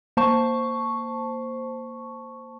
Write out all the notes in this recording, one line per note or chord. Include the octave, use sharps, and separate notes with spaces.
A#3 C5 A5 C#6